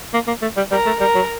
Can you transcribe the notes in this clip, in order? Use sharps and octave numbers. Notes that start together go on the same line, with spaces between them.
A#3
A#3
A3
G3
G3 A#4
A3
G3 A#4
F#3